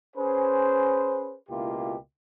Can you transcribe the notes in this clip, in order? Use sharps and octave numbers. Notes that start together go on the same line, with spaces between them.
C#4 G#4 B4 C5
C#2 B2 A#3 E4 F4 G4